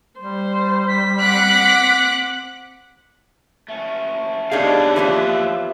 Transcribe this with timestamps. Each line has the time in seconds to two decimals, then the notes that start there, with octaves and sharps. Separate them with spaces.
0.20 G3 C5
0.88 B6
1.21 C4 F#5 D6 F#6
3.68 A3 C#4
4.52 D4 D#4 G4 G#4 C#5 F5
4.96 E3 F3 B3 E5